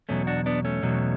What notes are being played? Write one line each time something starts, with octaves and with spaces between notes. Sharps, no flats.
E2 B2 F#3 A3 C#4
D4 F#4
B3 D4
A3 C#4
E2 B2 F#3